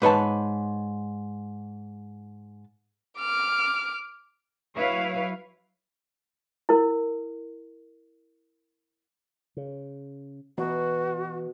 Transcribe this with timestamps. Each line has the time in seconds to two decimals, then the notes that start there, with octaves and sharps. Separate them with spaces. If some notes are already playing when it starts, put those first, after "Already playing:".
0.02 G#2 B4 C#5 A5
3.18 D6 F6
4.75 F#3 E4 B4 C#5 F5
6.69 E4 A#4
9.57 C#3
10.58 B2 E3 F#4